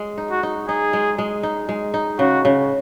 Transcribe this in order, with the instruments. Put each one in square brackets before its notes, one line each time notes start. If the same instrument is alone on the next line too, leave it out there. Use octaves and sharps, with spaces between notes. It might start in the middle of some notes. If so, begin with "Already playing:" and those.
Already playing: [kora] G#3
D#4
[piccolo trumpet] F#4
[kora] D#4
[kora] D#4 [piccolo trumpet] G#4
[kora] G#3
G#3
D#4
G#3
D#4
[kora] C#3 [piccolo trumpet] F#4
[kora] C#3